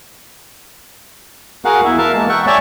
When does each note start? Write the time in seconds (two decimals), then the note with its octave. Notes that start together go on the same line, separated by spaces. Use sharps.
1.65 F#4 G#4 A#4 F5 F#5
1.84 E2 E4 E5
1.98 A#4 E5 F5 A5
2.14 E3 G#3 A#3 A5
2.29 E5 F#5 G5 C#6
2.47 C#5 D5 E5 G#5 A5 C#6